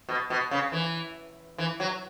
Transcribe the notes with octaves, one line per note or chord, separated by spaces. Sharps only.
B2
B2
C#3
E3
E3
F#3